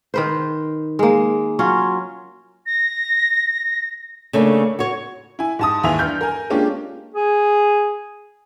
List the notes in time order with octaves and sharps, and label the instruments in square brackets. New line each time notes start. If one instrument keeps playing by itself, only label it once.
[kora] D#3 B4 C5
G#3 A#3
F#3 C#4 F4
[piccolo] A#6
[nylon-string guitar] C#3 A3 A#3 D4
F#4 C#5
[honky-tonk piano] E4 G#5
G#2 A5 D#6
D#2 G#2 E3 E5 G#5 F7
G2 F6 G6
A#4 G#5
G#3 A#3 C#4 D4 F4 G4
[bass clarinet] G#4